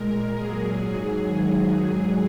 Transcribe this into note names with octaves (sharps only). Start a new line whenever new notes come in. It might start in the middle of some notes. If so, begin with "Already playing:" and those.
Already playing: A#2 G#3 A#4
A#2 F#3 G#4
G#2 F#3
G#2 D#3 F#3
G#2 F#3 G#4